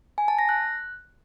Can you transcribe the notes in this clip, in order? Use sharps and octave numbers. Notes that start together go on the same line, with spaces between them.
G#5
A5
A#6
F#6